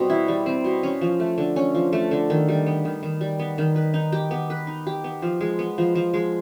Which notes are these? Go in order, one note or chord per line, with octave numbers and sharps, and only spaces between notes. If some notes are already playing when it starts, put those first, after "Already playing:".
Already playing: B2 G3 C4
E4
G3
C4
B2
C#4
F3
A3
D3
C#4
F3
A3
D3
D#3
G3
B3
D#3
D#3
G3
B3
D#3
B4
D#4
G4
B3
B4
D#4
G4
B3
F3
G#3
B3
F3
F3
G#3